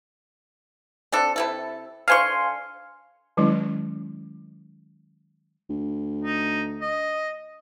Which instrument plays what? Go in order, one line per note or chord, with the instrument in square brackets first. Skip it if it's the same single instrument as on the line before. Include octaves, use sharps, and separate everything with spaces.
[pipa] C4 D4 A4
C3 E4 A4
[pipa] D3 C5 C#6 [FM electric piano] F5 G#5 C6
[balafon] D#3 F#3 G#3 C#4 E4
[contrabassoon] D2
[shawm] D#4
D#5